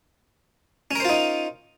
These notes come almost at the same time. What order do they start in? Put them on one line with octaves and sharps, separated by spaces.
C#4 A#4 C5 F4 D#4